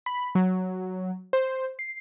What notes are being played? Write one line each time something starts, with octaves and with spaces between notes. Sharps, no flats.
B5
F#3
C5
C7